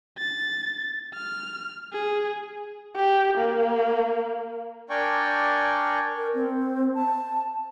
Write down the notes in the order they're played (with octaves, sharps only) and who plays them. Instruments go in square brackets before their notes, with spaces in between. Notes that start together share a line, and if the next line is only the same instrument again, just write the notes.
[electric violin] A6
F6
G#4
[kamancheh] G4
A#3
[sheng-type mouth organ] D4 A#4 D5 G5 G#5 C#6
[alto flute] A#4
C4
A5